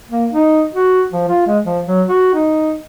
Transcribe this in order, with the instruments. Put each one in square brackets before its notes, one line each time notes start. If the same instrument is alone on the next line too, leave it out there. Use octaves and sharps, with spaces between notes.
[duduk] A#3
D#4
F#4
F3
F4
G#3
F3
F#3
F#4
D#4